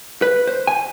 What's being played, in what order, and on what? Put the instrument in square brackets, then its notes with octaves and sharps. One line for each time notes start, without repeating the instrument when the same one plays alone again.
[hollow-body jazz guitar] B4
C5
G#5